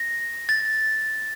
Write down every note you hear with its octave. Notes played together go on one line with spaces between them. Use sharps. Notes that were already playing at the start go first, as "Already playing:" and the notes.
Already playing: A#6
A6